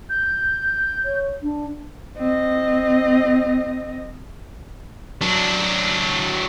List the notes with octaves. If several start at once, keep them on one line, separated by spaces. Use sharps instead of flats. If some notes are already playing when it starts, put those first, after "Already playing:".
G6
C#5
D4
C4 D#5
F#3 D4